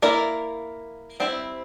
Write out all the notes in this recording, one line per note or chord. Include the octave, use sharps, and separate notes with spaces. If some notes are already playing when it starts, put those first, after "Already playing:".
A#3 E4 A#4 D5
G3 C4 E4